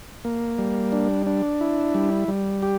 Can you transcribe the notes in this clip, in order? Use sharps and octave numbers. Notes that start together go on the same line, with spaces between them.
A#3
G3
D4
D4
E4
G3
G3
G4